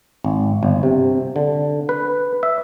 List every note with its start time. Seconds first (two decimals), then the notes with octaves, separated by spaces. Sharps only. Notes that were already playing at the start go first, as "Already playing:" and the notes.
0.25 G#1
0.63 G1
0.83 C3
1.36 D3
1.89 B4
2.43 E5